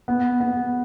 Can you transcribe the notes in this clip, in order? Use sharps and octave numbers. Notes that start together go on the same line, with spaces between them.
B3
B3